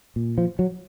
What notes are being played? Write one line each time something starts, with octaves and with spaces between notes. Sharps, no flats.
A#2
F3
F#3